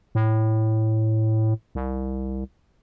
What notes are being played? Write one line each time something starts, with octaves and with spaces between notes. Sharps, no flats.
A2
C2